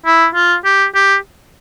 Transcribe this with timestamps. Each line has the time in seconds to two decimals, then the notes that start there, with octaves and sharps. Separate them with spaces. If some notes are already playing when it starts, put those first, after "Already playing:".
0.06 E4
0.35 F4
0.65 G4
0.95 G4